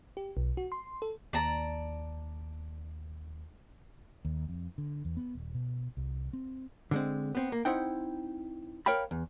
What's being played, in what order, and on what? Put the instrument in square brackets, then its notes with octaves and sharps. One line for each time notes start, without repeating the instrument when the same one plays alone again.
[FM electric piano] G4
B1
F#4
C6
A4
[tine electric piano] D#2 [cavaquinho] D5 A5 A#5
[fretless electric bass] D#2
F2
D3
E2
B3
D#1
B2
C2
C4
[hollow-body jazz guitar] D3 G#3 C4
B3 C4
A#3
C4 D#4 E4 F#5 G5
A#4 C#5 F5 G5 B5
E2